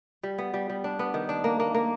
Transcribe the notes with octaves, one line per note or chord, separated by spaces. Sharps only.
G3
B3
G3
G3
D4
B3
D#3
D4
A#3
A#3
A#3